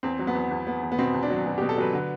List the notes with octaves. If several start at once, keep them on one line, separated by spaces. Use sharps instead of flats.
E2 C4
F#3
B3
E2
E2
B3
E2
B3
B2 C4
E2
D4
F#3
B2
B2 G4
A4
F#3 B4
D3